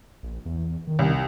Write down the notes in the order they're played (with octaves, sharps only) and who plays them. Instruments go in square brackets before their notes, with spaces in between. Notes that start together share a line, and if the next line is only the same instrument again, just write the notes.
[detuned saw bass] A#1
E2
D#3
[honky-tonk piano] C2